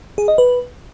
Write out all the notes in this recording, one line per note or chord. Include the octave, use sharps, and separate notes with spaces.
G#4
D#5
B4